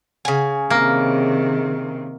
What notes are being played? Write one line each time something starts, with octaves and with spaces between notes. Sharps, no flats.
C#3 G#5
C3 D#3 A#3